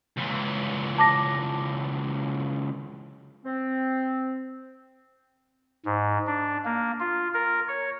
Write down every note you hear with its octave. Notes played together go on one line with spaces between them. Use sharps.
C#2 E3
A5 D6 A#6
C4
G#2
D4
A#3
F4
A#4
C#5